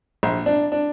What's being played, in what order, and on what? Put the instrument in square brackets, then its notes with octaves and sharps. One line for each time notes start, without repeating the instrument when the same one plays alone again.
[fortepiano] A#1
D4
D4